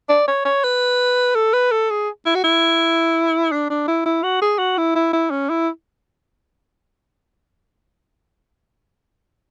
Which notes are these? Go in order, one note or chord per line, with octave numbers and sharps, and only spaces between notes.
D5
C#5
C#5
B4
A4
B4
A4
G#4
E4
F#4
E4
D4
D4
E4
E4
F#4
G#4
F#4
E4
E4
E4
C#4
E4